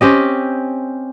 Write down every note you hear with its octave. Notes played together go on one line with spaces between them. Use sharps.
C4 C#4 G4 D#5